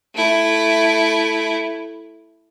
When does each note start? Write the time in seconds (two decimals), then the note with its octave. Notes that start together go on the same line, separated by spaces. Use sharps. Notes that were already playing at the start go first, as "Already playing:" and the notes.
0.15 A3 E4